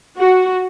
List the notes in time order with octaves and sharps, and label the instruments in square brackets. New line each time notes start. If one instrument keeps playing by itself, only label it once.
[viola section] F#4